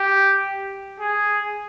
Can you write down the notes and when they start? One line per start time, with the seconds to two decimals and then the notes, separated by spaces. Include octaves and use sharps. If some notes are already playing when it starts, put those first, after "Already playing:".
Already playing: G4
1.00 G#4